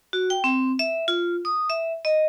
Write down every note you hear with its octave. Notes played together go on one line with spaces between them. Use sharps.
F#4
G5
C4
E5
F4
D#6
E5
D#5